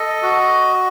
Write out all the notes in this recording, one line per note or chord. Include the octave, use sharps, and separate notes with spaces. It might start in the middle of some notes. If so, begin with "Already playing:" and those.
Already playing: A4 D#5
F#4